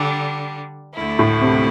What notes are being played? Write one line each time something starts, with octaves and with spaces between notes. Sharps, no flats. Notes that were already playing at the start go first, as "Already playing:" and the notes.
Already playing: D3 G3 D4
D2 D3 A3 E4
A2
C3